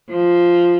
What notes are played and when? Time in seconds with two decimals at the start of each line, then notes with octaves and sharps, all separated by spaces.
0.10 F3